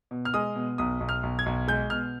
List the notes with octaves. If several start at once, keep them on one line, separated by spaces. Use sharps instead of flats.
B2
F6
G#3 D#6
B2
B1 D#6
B1
F6
B1
G#6
B1
G#3 G6
B2 F6